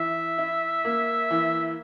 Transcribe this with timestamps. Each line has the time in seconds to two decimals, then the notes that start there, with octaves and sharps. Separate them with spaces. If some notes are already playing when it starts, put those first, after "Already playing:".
Already playing: E3 E5
0.38 E4
0.84 A#3
1.30 E3